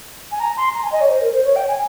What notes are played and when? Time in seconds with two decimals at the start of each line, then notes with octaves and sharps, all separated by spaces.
0.31 G#5
0.39 A#5
0.57 C6
0.74 A#5
0.83 G#5
0.92 D#5
1.00 C#5
1.09 C5
1.21 A#4
1.32 C5
1.44 C#5
1.55 G5
1.67 G#5